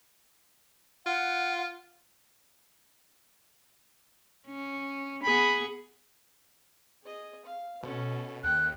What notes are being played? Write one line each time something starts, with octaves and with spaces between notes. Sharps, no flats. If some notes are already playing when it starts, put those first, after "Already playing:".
F4 F#5
C#4
B3 G#4 B5
G#4 D#5
F5
B2 C#4 A4
D#2 G5 F#6